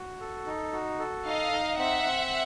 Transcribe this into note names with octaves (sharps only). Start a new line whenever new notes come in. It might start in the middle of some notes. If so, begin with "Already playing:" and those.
Already playing: F#4
A4
D#4
F#4
A4
D#4 D#5 F5
D#4
C4 E5 F#5
C4